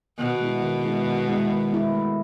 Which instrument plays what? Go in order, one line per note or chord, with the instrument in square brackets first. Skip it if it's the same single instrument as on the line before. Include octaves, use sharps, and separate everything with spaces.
[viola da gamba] B2 [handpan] D#3
[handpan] G#3 B3 E4
D#3
G#3 B3 E4
D#3
G#3 B3 E4
D#3
G#3 B3 E4
A3